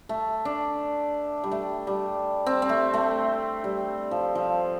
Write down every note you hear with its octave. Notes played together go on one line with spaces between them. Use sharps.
A3
D4
G3
A3
G3
C4
C4
A3
A3
G3
F3
F3